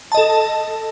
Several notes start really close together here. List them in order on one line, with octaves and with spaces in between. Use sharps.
A5 D#5 A4